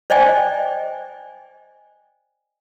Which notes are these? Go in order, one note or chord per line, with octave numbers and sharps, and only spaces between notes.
C5 D5 D#5 G5 G#5